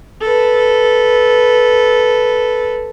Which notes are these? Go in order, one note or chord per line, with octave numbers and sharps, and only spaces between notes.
A4 B4